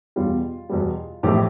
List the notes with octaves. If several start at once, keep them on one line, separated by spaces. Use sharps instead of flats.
E2 B2 G3 F4
E2 B2 G3
A1 A2 F3 A3 G4